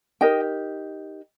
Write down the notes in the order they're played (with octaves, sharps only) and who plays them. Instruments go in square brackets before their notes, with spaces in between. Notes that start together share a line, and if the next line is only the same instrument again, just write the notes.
[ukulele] D#4 G4 A#4 D#5 G5